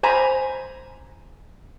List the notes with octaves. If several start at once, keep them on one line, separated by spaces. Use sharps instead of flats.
C5 G#5 A#5 B5